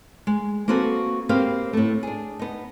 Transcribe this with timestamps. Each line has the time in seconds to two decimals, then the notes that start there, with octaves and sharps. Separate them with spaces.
0.27 G#3
0.68 A#3 C4 F#4 A4 B4
1.29 A#3 C4 G4 B4 F5
1.73 A2 A3
2.03 D4 G#4
2.39 B3 D#4